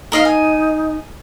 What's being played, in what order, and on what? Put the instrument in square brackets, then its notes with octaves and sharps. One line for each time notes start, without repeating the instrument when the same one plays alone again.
[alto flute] D#4 [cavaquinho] A#4 D#5 F5
[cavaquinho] G#5